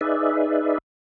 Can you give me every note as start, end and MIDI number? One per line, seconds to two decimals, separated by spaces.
0.01 0.78 63
0.01 0.78 68
0.01 0.78 71
0.01 0.78 74
0.01 0.78 76